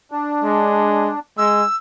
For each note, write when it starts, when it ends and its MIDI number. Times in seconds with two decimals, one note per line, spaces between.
0.12 1.19 62
0.44 1.11 56
1.38 1.63 56
1.38 1.76 88